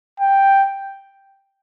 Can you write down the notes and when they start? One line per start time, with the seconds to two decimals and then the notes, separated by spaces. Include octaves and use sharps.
0.20 G5